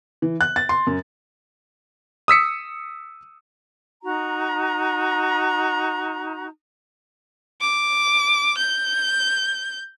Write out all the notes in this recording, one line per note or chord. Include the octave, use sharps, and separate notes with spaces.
E3
F#6
A6
C6
F#2
D#6 E6 B6 C#7
D#4 F#4 A#5
D6
G6